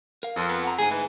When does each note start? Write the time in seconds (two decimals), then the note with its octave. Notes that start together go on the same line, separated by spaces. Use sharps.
0.23 A#4 F5
0.35 F2
0.48 B3
0.64 F#5 A#5
0.79 D2 G#2 G#4 G#5
0.91 E3